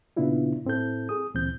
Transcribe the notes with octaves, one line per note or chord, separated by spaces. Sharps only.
A#2 C#3 B3 D4 E4 F4
A2 C4 E4 A4 G6
G#4 D#6
D2 A#2 E3 C4 G6